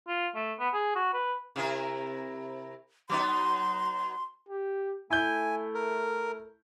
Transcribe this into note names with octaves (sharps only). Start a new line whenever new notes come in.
F4
A3
B3
G#4
F#4
B4
C3 E4 A#4
F#3 B3 D#4 C6
G4
A3 E4 G#5 G6
A#4